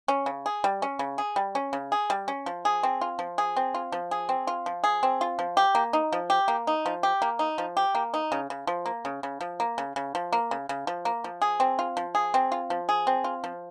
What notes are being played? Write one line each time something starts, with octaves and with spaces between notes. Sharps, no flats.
C#4
C#3
G#4
G3
C#4
C#3
G#4
G3
C#4
C#3
G#4
G3
C#4
F3
G#4
C4
F4
F3
G#4
C4
F4
F3
G#4
C4
F4
F3
G#4
C4
F4
F3
G4
A#3
D#4
F3
G4
A#3
D#4
F3
G4
A#3
D#4
F3
G4
A#3
D#4
C#3
C#3
F3
A#3
C#3
C#3
F3
A#3
C#3
C#3
F3
A#3
C#3
C#3
F3
A#3
F3
G#4
C4
F4
F3
G#4
C4
F4
F3
G#4
C4
F4
F3